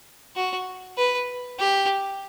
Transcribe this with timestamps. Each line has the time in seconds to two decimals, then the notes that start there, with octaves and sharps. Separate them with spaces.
0.36 F#4
0.98 B4
1.59 G4